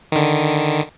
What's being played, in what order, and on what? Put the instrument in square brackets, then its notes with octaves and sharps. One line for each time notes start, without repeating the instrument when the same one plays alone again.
[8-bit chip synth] D3 D#3